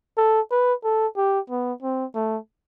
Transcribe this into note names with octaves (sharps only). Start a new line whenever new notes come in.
A4
B4
A4
G4
B3
C4
A3